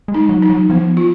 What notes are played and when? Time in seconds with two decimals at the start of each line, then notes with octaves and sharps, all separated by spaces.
0.08 G#3
0.14 D#4
0.29 F#3
0.43 D#4
0.49 F#3
0.70 F3 B3
0.97 F4